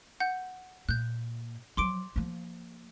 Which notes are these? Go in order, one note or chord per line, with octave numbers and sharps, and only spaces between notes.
F#5 G6
A#2 F#6 G6
F3 F#3 C6 D6 D7
F3 A#3